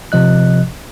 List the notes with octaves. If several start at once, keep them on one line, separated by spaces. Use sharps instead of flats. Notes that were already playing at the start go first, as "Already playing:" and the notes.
C3 F3 D#5 F#6